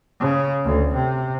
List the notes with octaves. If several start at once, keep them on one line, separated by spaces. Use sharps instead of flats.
C#3
D2
C3